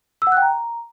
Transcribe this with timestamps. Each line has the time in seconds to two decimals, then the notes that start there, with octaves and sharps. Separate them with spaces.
0.22 E6
0.27 F#5
0.32 F#6
0.37 G5
0.42 A#5